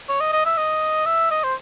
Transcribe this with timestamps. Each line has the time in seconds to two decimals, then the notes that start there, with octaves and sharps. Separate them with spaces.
0.09 C#5
0.20 D#5
0.33 D#5
0.45 E5
0.57 D#5
1.06 E5
1.31 D#5
1.43 C5